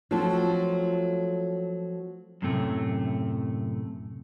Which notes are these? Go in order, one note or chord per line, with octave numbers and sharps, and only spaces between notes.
F3 F#3 A3 C4 F4 A4
F#2 A2 C3 A3